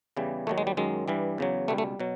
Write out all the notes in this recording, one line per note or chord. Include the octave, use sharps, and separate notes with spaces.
E2 C#3 E3 G3
D#2 D#3 F#3 A3
G#3
G3
F#2 D#3 F#3 G#3
G2 E3 G3
E2 C#3 F#3
C#2 B2 G3 A3
A3
B2 F#3